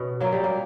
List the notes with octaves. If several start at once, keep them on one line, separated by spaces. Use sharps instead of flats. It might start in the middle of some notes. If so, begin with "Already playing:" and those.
Already playing: B2 B3 C#4
A#2 F#3 A#3
G3
A#3